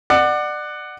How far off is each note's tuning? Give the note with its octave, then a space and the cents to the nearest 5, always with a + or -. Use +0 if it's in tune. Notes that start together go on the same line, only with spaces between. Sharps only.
D5 +30 F#5 +5